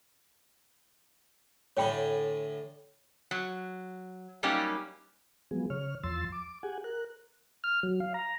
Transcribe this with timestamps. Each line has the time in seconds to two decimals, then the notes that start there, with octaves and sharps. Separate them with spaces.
1.77 A2 D3 A4 C#5 D5 G5 G#5 B5
3.31 F#3
4.43 F#3 G3 A#3 C#4 D#4 G4
5.51 F3 F#3 G#3 B3 G#4
5.70 C#3 C#5 F6
6.03 E2 F3 C6 E6 A6
6.32 D6
6.63 G4 G#4 F#5 G#5
6.84 A#4 F#6
7.64 F6
7.83 F#3
8.00 F5
8.14 A#5